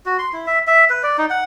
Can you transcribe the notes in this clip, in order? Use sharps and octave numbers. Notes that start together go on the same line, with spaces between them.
F#4
C6
E4
E5
E5
B4
D5
D#4
F#5